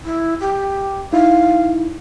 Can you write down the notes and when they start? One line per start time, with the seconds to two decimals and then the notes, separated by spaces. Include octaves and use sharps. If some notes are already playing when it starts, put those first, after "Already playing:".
0.05 E4
0.40 G4
1.13 D#4 E4 F5